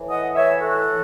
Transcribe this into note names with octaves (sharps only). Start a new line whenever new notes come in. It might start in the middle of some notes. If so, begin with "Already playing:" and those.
Already playing: A2 E3
D#5 F#5
A2 E3 C#5 E5
F#4 A4
A2 E3